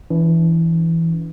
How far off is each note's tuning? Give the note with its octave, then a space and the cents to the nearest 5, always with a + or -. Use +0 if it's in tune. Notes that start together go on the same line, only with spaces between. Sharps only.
E3 +0 D4 -40